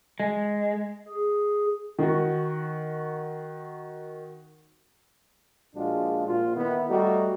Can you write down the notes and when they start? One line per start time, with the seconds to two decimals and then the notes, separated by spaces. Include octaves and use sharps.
0.20 G#3
1.08 G#4
1.99 D#3 F#4
5.75 A#1 G#3 D4 F4 F#4
6.27 A#1 F4
6.56 D#3 B3 E4
6.88 G3 A3 D#4 F#4